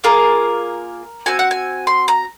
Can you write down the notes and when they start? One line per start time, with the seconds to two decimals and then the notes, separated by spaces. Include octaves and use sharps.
0.04 A#3 F4 G#4 A#4
1.26 C4 F#4 G#5
1.39 F#5
1.51 G#5
1.87 C6
2.08 A#5